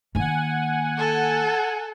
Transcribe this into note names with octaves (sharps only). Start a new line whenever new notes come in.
D#3 A#3 F#5 G#5
A4